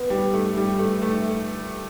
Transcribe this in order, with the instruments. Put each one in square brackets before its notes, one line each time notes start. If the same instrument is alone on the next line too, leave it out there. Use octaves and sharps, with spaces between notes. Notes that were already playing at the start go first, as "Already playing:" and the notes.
Already playing: [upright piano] B3
G3
A3
G3
A3
A3